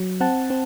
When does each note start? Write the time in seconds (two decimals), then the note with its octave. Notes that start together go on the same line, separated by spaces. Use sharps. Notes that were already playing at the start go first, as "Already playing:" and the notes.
Already playing: F#3
0.21 C4 F#5 A5
0.50 C4